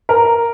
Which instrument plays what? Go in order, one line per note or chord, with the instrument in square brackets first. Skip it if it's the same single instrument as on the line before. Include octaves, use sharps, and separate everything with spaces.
[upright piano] A#4